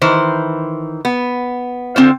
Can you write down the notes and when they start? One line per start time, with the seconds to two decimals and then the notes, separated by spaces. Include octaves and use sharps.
0.01 D#3 E3 C5
1.05 B3
1.96 D3 C4 F4 C5